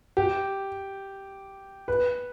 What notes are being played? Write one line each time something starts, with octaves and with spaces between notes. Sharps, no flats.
G4
B4